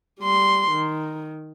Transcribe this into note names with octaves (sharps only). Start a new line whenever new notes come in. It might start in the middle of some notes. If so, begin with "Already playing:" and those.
G3 C6
D#3